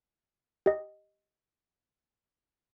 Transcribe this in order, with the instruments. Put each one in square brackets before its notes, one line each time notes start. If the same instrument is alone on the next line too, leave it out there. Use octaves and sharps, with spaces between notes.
[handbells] G4 D#5